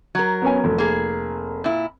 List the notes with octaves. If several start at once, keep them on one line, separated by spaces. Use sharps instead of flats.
F#3 A#4
B3 C#4 G#5
F1
A#3 G#4
A#2 E4